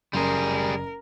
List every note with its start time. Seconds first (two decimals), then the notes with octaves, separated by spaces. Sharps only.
0.13 F#1 G3 G#4 A#4 C6